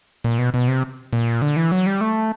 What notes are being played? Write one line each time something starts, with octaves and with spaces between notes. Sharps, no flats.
A#2
B2
B2
C3
A#2
D3
E3
F#3
G3
A3